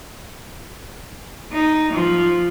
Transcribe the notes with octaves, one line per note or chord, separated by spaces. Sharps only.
D#4
F3